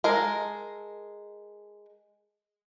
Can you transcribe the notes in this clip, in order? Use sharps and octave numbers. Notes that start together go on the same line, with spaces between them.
G#3 A4 A#4